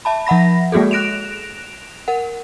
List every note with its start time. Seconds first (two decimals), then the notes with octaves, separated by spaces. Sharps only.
0.05 E5 A5 B5
0.27 F3 E5 F#5 B5 A#6
0.72 G#3 A#3 F#4 G#4 A4
0.91 F#6 A#6 D7 E7 F7
2.08 A#4 F#5